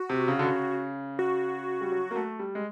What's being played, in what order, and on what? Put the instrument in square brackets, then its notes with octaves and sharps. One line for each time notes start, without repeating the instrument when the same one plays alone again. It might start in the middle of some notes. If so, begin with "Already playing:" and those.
Already playing: [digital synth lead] F#4
[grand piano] C3
C#3
D3
C#3
[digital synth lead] F#4
[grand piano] G3
F#3
A#3
A3
G3
G#3